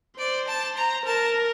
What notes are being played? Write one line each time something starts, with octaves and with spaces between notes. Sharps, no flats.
C5 D5
A5
A#5
A#4 A5